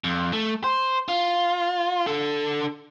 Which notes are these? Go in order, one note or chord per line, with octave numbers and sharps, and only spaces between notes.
F2
A3
C5
F4
D3 A4